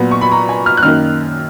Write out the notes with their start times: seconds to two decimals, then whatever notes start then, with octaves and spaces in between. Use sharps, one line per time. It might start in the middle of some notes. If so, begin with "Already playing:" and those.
Already playing: A#2 F#3 B3
0.11 C#6
0.21 B5
0.32 A#5
0.49 G#5
0.66 F6
0.77 F#6
0.83 F#2 D#3 A#3 F6